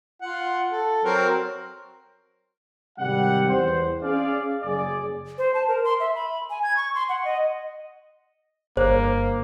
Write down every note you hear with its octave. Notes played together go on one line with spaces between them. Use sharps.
F4 F#5
A4
F#3 C4 A#4
G#1 C3 G3 G4 F#5
E2 C5
C#4 G#4 D5 F5
F#1 G#4 D5
C5
A5
A#4
C6
E5
B5
G#5
G#6
C#6
C6
F#5
D#5
G1 A#3 C5